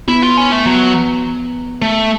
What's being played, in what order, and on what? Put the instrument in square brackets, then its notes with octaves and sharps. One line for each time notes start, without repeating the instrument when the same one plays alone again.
[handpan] B3 [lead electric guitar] E4
[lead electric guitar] F4
C#4
A3
[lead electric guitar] F#3 [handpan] B3
[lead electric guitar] A3